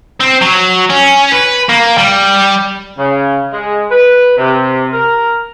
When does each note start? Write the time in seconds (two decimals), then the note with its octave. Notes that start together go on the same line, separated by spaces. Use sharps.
0.20 C4
0.42 F#3
0.90 C#4
1.32 B4
1.69 A#3
1.98 G3
2.98 C#3
3.53 G#3
3.91 B4
4.37 C3
4.93 A#4